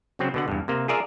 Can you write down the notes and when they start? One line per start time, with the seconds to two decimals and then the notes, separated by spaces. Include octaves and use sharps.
0.19 C#3 F#3 C4
0.34 B2 D3 F#5
0.48 E2 G2
0.68 C3 A#3
0.88 F4 G#4 A#4 D5 E5